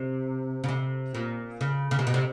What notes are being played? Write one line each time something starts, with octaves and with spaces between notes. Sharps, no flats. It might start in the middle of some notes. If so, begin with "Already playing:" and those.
Already playing: C3
C#3
C3
A#2
C#3
C#3
C3
B2
C3